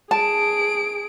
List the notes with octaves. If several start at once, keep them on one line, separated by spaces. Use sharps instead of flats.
G#4 A5 D7